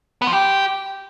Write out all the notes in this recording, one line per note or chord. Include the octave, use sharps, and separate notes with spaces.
B3
F3
G4